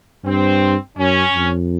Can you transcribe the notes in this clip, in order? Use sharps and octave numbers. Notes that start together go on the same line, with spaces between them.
G2 C4
F#2 C#4
F2